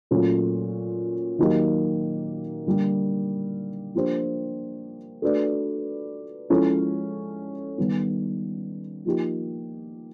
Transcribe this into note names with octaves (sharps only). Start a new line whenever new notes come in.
A#2 F#3 A3 C#4 F4
D#3 F#3 A#3 D#4 G4
D3 G3 A#3
F3 A#3 D4 G4 C5
A3 D4 F#4 B4 D5
F3 G#3 C#4 E4 A4
D#3 G3 B3
F3 A#3 D#4 G4